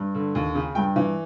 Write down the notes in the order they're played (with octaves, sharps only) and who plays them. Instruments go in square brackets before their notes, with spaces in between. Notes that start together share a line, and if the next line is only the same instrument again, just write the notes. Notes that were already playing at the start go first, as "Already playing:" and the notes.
Already playing: [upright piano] G2
D3
D#2
C#3
G2 G5
E3